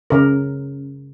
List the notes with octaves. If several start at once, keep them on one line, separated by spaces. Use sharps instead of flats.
C#3 A#4